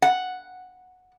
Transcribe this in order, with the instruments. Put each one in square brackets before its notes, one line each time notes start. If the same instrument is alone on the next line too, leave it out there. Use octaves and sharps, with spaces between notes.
[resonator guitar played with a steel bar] F#5